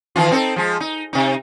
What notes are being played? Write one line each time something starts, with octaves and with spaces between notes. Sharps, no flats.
D#3 E3 F4
C4 D#4 A4
F3 G#3
D#4
C3 D#4